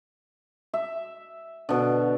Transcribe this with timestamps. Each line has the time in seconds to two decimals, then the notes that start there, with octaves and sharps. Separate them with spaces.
0.73 E5
1.69 B2 D3